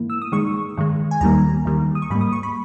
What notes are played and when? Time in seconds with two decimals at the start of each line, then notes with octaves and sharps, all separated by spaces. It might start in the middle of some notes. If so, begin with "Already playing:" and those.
Already playing: G#2 E3 A#3
0.10 E6
0.22 D#6
0.32 G2 D#3 G#3 C#6
0.77 G2 D#3 G#3
1.11 G#5
1.21 D#2 D#3 G3 A#3 A#5
1.65 D#2 D#3 G3 A#3
1.95 D#6
2.02 C#6
2.10 G#2 G3 A#3 B5
2.21 D#6
2.33 C#6
2.43 B5